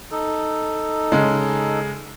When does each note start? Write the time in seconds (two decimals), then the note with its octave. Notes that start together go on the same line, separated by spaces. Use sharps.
0.11 D#4 A4
1.12 C#3 G#3